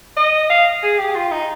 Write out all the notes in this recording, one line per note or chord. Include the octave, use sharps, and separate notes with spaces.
D#5
F5
G#4
G4
F4
D#4